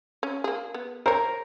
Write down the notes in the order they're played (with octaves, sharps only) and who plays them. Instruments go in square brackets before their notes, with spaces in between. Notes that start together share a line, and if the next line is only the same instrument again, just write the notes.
[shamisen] C#4
A#3 G#4
B3
[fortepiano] A#4 [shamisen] C5 C#5